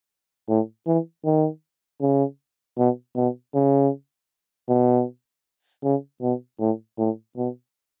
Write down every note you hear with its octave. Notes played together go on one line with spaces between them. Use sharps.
A2
E3
D#3
C#3
B2
B2
C#3
B2
C#3
B2
A2
A2
B2